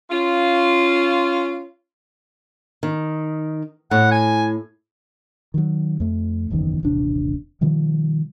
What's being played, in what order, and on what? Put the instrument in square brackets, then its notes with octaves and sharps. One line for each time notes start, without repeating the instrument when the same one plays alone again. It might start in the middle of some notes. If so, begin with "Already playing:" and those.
[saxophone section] C#4 F4
[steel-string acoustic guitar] D#3
[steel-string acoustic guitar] A2 [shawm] F#5
[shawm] G#5
[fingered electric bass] D#3 F#3
F2 A3
F#1 B1 E2 D#3
D#1 A1 C3 D4
B2 D#3 F3 G3